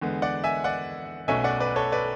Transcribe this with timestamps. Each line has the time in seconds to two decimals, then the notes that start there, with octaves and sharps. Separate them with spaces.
0.02 E2 D3 G#3 B3
0.22 D5 F#5
0.44 E5 G#5
0.64 D5 F#5
1.28 B1 B2 A3 C#4 E5 G#5
1.44 D5 F#5
1.60 B4 D5
1.76 A4 C#5
1.92 B4 D5